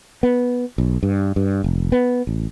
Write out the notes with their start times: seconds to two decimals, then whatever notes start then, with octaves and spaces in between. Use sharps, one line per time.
0.23 B3
0.78 B1
1.03 G2
1.36 G2
1.64 F1
1.92 B3
2.27 A1